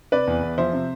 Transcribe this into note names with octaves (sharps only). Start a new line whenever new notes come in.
C3 B4 D5
E2
E2
F3 C5 E5
C3